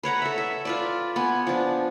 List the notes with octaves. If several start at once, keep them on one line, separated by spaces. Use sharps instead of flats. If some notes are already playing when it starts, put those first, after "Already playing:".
B4 C#5 F#5 A#5
A4 E5
E5
F4 B4 D5
B3 G#5
F3 D4